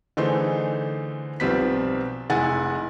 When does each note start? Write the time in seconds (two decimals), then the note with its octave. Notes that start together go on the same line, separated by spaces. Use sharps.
0.17 D3 E3 A3 D#4 G#4 C5
1.40 B1 F3 G3 C4 B4 B6
2.30 F1 G#3 E4 F#5 G#5 A6